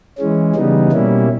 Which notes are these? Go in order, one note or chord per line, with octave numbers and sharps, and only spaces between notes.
E3 G#3 C#4
C#3 E3 G3 B3 D#4
B2 G3 A#3 C#4 E4